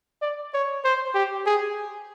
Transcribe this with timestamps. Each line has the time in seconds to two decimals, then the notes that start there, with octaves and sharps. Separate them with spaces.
0.22 D5
0.54 C#5
0.84 C5
1.14 G4
1.46 G#4